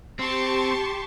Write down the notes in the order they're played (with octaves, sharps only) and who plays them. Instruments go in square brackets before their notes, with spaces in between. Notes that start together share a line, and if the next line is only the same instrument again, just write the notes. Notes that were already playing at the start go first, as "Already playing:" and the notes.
[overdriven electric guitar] C4 [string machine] G4 [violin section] A5 C6 C#6